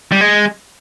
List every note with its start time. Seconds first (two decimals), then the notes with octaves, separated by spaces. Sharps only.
0.12 G3
0.21 G#3